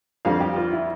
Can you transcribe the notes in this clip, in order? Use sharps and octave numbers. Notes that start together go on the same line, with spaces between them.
F2 D3 G3 F5
G4
F4
E4